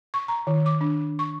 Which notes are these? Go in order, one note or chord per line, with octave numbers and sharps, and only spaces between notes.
C#6
A#5
D#3
D6
D4
C#6